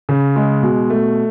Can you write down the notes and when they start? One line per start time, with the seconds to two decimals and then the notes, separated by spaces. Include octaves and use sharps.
0.09 C#3
0.36 G#3
0.63 B2
0.90 A3